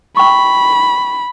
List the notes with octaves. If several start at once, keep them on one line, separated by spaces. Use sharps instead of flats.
G5 B5 C#6